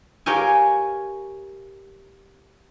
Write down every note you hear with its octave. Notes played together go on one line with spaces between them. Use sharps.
G4 A#4 C#5 F5 G5 G#5